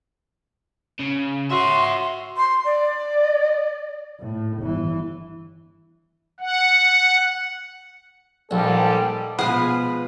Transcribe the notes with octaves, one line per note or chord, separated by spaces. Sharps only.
C#3
F#4 C#5 E5 C6
C6
D5
A2
G1 E3
F#5
A#1 G#2 D#3 G3 A4
B2 F3 G#3 F4 G#4 B4 F#5